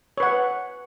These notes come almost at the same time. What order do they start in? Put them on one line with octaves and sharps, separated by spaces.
C#5 B4 F#5